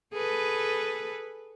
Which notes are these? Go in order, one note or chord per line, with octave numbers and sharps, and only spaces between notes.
G#4 A4 B4